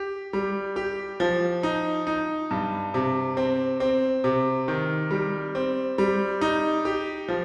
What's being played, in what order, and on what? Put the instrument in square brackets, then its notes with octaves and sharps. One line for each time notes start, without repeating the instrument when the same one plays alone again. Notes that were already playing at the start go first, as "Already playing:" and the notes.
Already playing: [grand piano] G4
G3
G4
F3
D#4
D#4
G2
C3
C4
C4
C3
D#3
G3
C4
G3
D#4
G4
F3